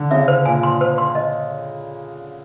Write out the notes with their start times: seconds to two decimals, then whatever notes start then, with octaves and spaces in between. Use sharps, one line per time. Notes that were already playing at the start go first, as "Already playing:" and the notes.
Already playing: D3
0.11 C#3 E5
0.28 C5
0.45 A#2 G#5
0.63 C6
0.81 C5
0.98 C6
1.15 D#5